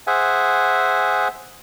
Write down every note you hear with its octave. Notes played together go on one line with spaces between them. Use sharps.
G#4 C5 E5 F#5 G#5